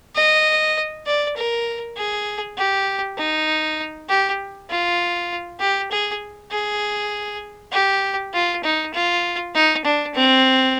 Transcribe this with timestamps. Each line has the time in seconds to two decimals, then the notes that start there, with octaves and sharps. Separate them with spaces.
0.15 D#5
1.06 D5
1.37 A#4
1.96 G#4
2.57 G4
3.18 D#4
4.09 G4
4.70 F4
5.60 G4
5.91 G#4
6.51 G#4
7.72 G4
8.33 F4
8.64 D#4
8.94 F4
9.55 D#4
9.84 D4
10.15 C4